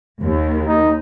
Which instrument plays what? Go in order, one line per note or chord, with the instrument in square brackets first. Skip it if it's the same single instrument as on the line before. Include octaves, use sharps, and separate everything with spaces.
[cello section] D#2
[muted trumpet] D#4